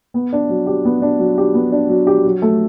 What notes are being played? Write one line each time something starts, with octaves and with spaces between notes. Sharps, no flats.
B3
D4
F#3
G4
B3
D4
F#3
G4
B3
D4
F#3
G4
F#3
A3